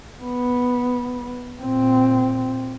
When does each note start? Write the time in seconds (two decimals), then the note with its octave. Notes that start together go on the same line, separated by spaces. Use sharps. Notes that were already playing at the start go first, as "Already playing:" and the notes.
0.22 B3
1.62 A#2 C4